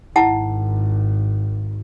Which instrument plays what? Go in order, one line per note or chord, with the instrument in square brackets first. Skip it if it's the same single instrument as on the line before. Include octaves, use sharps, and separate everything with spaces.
[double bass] G#1 [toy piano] E4 F#5 A5